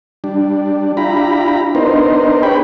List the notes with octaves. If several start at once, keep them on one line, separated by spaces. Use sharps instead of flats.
G3 D4
D4 E4 F4 G4 A#5 B5
B3 D4 D#4 A#4 C5
G4 G#4 B4 C#5 G5 B5